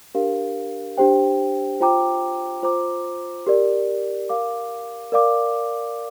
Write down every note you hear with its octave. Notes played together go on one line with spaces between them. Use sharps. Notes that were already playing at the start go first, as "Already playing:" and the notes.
D4 G4 A#4 F5
D4 G4 C5 G5
F4 C5 G5 A#5 D6
F4 C5 A#5 D6
G4 A#4 D5
A#4 F5 D6
A#4 D5 F5 D6